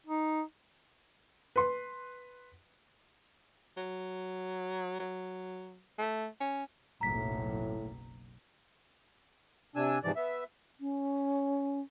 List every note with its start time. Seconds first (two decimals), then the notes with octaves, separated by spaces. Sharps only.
0.07 D#4
1.56 B4 C6
3.77 F#3
5.00 F#3
5.99 A3
6.40 C#4
7.01 F#1 B1 A2 A#5 B6
9.76 C3 D4 G#5 E6
10.03 G#2 C3 E3 F3 D5
10.16 B3 E5
10.80 C#4